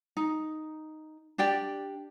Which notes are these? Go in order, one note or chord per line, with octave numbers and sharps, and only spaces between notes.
D#4
D4 G4 D5 G5